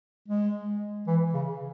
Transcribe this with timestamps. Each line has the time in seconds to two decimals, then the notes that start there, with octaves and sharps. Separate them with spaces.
0.28 G#3
1.07 E3
1.33 C#3